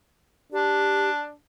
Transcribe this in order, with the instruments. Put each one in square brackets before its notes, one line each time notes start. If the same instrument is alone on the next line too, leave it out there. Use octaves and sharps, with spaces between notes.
[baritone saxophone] D4 [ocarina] G4